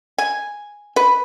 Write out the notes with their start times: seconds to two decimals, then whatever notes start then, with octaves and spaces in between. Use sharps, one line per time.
0.18 G#5
0.96 B4